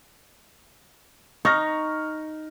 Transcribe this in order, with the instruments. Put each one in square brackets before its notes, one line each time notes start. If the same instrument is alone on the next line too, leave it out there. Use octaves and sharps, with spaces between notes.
[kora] D#4 [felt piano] C#6 F6 A#6